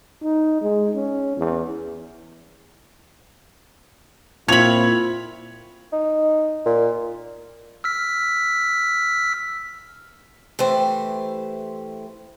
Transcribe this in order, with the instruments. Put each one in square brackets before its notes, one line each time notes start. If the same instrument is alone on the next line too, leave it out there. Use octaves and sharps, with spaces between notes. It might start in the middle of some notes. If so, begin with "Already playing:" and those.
[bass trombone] D#4
G#3
C#4
E2
[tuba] A#2 [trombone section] C4 E4 F4 [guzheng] C#5 B5 [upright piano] G#6 F7
[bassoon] D#4
A#2
[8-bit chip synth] E6 F6 B6
[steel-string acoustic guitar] E3 A3 G4 C5